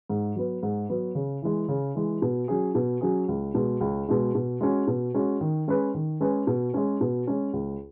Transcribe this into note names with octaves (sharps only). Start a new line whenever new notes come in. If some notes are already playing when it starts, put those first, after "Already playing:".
G#2
F#3 B3
G#2
F#3 B3
C#3
E3 G#3
C#3
E3 G#3
B2
F#3 C#4 G#4
B2
F#3 C#4 G#4
C#2
B2 G#3
C#2
B2 G#3
B2
G#3 C#4 F#4
B2
G#3 C#4 F#4
D#3
G#3 C#4 G#4 B4
D#3
G#3 C#4 G#4 B4
B2
G#3 C#4
B2
G#3 C#4
C#2